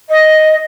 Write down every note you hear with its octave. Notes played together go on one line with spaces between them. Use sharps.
D#5